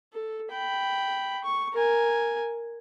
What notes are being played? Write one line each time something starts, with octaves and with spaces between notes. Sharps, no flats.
A4
G5 B5
C#6
A#4 G#5